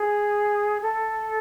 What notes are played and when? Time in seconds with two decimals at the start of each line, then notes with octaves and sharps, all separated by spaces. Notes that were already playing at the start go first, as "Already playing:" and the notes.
Already playing: G#4
0.82 A4